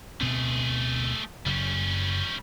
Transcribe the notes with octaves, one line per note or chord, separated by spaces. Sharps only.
D2 B2 A3 C4 G#4
F#1 F#2 C#3 G3 C#4